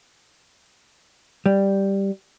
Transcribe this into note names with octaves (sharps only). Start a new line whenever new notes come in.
G3